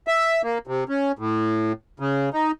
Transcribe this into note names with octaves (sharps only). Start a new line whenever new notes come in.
E5
A#3
C3
C#4
A2
C#3
D#4